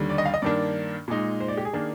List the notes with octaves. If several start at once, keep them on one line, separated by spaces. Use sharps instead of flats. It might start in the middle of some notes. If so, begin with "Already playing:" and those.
Already playing: D#2 D3 G3
D5
D#5
F5
D#5
G2 D#3 A#3 D4 D5
A#2 G#3 D#4
C5
D5
G4
G#4
D#3 A#3 D4